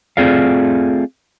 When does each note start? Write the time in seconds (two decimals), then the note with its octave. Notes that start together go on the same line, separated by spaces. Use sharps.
0.17 A3 C4 F4 G#4 D5 F5